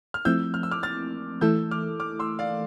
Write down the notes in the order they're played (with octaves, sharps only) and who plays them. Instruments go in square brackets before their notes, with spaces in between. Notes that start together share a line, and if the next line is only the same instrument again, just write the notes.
[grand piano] F6
[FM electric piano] F3 A3 C4 E4 [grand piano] E6 G6
[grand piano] F6
E6
D6 F6
F6 A6
[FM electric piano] E3 A3 E4 A4 [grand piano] E6 G6
[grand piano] D6 F6
D6 F6
C6 E6
D5 F5